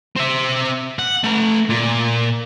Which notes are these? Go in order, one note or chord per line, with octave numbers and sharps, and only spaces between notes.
C4 E5
F#5
A3 A#5
A#2